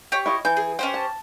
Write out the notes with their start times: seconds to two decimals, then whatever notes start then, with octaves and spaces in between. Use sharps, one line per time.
0.12 G4 C#5
0.26 E4 F4 D#5
0.45 E3 G6
0.57 G#4
0.79 C#4 G4 C5 G5
0.94 A5